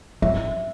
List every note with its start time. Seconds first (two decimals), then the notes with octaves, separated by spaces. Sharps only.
0.22 F#3 E5